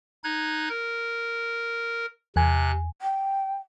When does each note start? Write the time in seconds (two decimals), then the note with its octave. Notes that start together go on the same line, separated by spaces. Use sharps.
0.24 D#4 F#6 G#6
0.69 A#4
2.36 E2 C3 G#5 F#6
3.02 G5